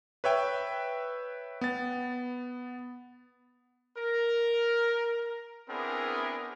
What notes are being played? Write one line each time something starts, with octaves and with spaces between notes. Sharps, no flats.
B4 C#5 E5 G5
B3 A6
A#4
B3 C4 D4 E4 G#4 A#4